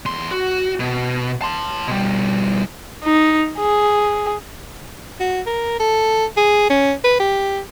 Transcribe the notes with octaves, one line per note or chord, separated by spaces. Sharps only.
E2 C6
F#4
B2
A5 C6
B2 G3
D#4
G#4
F#4
A#4
A4
G#4
C#4
B4
G4